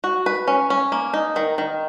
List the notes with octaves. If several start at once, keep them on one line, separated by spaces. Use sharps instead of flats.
F#4
B4
C#4
C#4
A#3
D#4
D#3
D#3